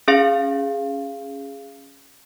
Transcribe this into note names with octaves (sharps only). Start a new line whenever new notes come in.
C#4 G#4 F5